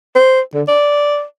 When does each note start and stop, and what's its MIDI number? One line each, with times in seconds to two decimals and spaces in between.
0.15 0.41 72
0.54 0.62 50
0.68 1.24 74